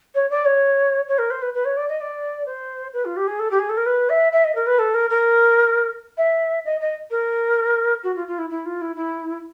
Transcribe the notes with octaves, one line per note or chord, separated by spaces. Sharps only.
C#5
D5
C#5
C#5
A#4
C5
B4
B4
C#5
D5
D#5
D5
C5
B4
F4
G4
G#4
A4
G4
G#4
A4
A#4
B4
E5
E5
D#5
A#4
B4
A4
A#4
A#4
E5
D#5
D#5
A#4
F#4
F4
F4
E4
E4
F4
E4
E4